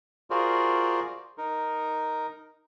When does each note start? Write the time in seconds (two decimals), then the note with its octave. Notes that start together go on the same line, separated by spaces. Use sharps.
0.30 F4 F#4 G#4 A#4 C5 D5
1.38 D#4 A#4